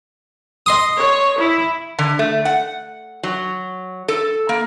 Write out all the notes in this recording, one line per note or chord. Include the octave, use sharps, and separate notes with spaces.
D#5 C6 D#6
C#5
E4
D3
A3
F#5
F#3
A4
A#3